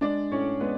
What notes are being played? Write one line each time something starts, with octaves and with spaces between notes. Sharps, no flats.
G#3 D4 D5
A2 C#4 C#5
G#3 B3 B4